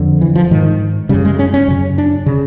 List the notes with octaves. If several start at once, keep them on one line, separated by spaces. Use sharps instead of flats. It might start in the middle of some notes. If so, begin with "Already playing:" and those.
Already playing: F2 D3
E3
F3
G#2 D#3
F#2 C#3 G3
G#3
C#4
C#4
F#2 C#3
D4
C#3